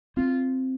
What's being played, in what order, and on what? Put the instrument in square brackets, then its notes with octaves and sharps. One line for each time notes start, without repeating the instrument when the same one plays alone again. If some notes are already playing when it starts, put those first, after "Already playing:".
[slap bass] C4 [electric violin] F4